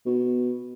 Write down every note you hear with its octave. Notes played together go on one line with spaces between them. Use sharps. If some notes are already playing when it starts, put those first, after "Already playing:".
B2